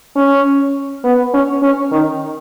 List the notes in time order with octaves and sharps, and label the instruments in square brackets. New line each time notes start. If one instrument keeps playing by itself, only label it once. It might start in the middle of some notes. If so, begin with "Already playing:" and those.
[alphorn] C#4
B3
C#4
C#4
D#3